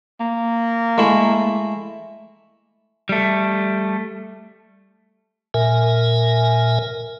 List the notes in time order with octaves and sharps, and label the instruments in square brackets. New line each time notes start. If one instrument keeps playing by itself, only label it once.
[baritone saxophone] A#3
[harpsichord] G#3 A3 E4
[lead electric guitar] G3 A3
[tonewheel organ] A#2 A#4 E5 G#5